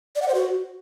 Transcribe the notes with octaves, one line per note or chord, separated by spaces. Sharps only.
D5
F#5
C5
F#4